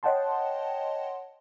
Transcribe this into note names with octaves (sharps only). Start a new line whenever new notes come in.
C#5 D#5 F#5 G5 A5 C6